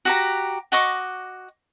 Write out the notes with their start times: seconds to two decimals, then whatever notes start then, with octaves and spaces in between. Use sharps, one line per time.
0.05 F#4 G4 A#5
0.72 F#4 D#5 C#6 D6